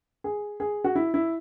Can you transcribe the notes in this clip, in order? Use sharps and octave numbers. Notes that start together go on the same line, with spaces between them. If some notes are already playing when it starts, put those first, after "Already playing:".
G#4
G#4
F#4
E4
E4